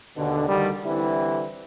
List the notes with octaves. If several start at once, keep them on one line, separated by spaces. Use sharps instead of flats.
D#2 B2 D3
D2 D3 D#3 G3
D3 E3 G3 C4 E4